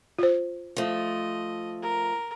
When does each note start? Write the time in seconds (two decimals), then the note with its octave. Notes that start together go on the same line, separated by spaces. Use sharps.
0.18 F4 C5
0.77 F3 A3 D#5
1.82 A#4